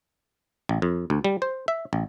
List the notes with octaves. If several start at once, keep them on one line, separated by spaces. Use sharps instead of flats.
A1
F2
D2
G3
C5
E5
A1